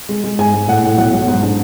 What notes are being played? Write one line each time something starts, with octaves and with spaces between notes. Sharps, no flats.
G#3
G#3
G#2 G#5
G#3
A2 F#5
A2
B1 F#5
B1
G#2
D4